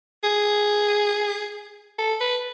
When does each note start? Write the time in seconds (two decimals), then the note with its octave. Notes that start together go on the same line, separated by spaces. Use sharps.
0.23 G#4
1.98 A4
2.20 B4